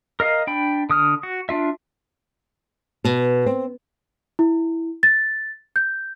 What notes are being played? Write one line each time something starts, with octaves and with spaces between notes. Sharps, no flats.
A#4 D#5 F5
D4 G5 B5
D3 D#6 F6
F#4
D4 F4 E5
B2
C4
E4
A6
G6